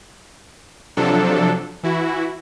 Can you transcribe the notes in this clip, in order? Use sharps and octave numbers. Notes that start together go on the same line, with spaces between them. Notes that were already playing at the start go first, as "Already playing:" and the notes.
C3 F3 F#3 D4 A4
E3 E4 F#4